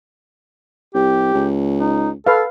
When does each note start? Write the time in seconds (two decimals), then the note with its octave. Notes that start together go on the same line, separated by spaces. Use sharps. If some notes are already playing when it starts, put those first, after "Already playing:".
0.95 C2 G4
1.34 C#2
1.79 D#4
2.27 A4 B4 F5